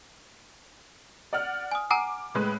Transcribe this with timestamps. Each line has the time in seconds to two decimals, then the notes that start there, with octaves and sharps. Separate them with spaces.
1.33 D5 F#5 F6
1.71 G#5 D#6
1.91 F#5 G#5 A#5 D6
2.35 A2 G#3 B4